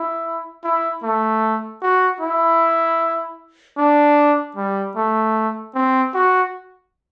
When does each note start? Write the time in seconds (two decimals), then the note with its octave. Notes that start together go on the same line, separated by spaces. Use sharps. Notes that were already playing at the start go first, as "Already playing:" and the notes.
Already playing: E4
0.64 E4
1.03 A3
1.82 F#4
2.21 E4
3.78 D4
4.57 G3
4.96 A3
5.75 C4
6.14 F#4